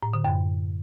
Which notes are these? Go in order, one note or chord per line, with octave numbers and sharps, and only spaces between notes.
A2
D3
F#2